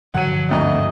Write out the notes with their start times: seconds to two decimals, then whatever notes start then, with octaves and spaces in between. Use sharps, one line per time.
0.14 G2 D3 F3 F#3 F#5 D#7
0.51 G#1 D2 D#5 A#5